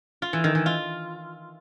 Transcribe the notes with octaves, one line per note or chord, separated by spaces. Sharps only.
F4
E3
D#3
E3
F4